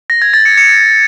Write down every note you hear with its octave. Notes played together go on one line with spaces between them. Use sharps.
A#6
G#6
A6
C#7
C#7